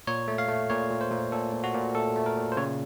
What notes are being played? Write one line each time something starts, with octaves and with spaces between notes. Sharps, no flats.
A#2 C#5
A3
F5
A3
A#2 C#5
A#2
C5
A#2
A#2 A4
A#2
F#4
A#2
A3 A4
A3
A#4
A#2
C5
C#3 C#5